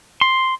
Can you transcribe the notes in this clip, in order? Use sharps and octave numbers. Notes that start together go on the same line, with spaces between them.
C6